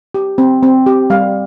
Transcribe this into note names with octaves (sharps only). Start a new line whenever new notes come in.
G4
C4
C4
G4
G3 F5